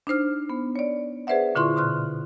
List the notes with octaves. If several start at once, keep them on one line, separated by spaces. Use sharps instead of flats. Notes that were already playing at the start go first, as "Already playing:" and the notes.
D4 D#4 C5 F6
B3
C#5 D5
G#4 B4 C5 D5 E5 F#5
A#2 D3 E4 F4 C6 C#6
B2 C6 F6 F#6